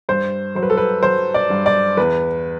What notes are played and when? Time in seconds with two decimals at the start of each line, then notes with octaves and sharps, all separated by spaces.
0.09 G2 C5
0.55 F#3 C5
0.63 B4
0.70 A4
0.77 B4
1.03 F#3 C5
1.34 D5
1.50 G2
1.66 D5
1.97 E2 B4